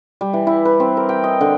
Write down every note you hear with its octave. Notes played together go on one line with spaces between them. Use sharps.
G3
E3
E4
B4
C4
A#4
G5
D#5
D3